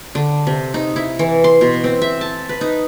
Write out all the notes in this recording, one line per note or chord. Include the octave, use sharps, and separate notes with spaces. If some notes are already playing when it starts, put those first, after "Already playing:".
D3
C3
D#4
E4
E3
C6
B2
C4
E5
A5
B4
D#4